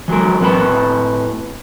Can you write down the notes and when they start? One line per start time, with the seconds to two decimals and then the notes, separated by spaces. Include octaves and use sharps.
0.08 E3 F#3 G#3 A#4
0.41 A2 C4 B4 A5 B5